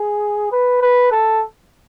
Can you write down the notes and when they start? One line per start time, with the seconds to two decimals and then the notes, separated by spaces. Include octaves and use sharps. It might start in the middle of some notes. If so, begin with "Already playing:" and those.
Already playing: G#4
0.52 B4
0.82 B4
1.11 A4